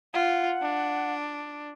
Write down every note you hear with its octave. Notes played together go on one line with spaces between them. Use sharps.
F4 F#5
D4